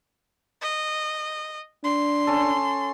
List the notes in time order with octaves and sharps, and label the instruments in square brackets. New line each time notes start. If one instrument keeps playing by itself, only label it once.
[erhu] D#5
[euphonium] D4 [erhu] C6
[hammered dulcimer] C#4 A4